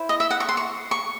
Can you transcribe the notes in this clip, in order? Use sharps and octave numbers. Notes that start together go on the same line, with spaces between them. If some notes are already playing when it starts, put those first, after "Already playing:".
Already playing: E4 C5
D#5
E5
F#5
C#6
C6
C#6
C#6